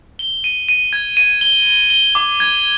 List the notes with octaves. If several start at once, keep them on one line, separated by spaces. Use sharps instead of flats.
G7
D#7
D#7
G#6
D#7
G7
G7
G7
D6
G#6